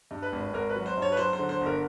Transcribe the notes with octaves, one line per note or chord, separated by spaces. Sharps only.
G2
B4
G#1
G#1 A#4
B4
F#3
C5
G2 C#5
B4
F#3 C5
C5
D3
C5
G1
A#4